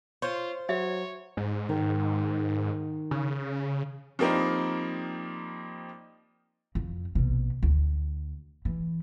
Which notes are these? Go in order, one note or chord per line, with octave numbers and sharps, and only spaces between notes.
F4 C5 C#5
F#3 C#5 E5
G#2
D#3
C#3
F3 G3 A#3 C4 D#4
F2
A#1 B2
D2
E3